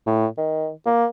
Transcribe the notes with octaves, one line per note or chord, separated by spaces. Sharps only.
A2
D#3
A#3